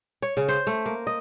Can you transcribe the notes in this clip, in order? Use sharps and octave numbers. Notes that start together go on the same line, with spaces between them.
C#5
C#3
C5
A3
A#3
D#5